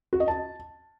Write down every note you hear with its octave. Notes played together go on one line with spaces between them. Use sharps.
F#4
D#5
A5